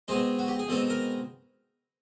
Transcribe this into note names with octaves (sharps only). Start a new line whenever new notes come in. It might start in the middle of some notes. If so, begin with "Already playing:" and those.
B2 G#3 C4 D#4 G#4
F#4
G4
G#4
B2 G#3 C4 D#4 A4
A#4